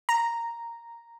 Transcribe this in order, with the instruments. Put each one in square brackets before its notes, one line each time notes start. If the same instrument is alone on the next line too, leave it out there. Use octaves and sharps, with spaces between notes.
[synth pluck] A#5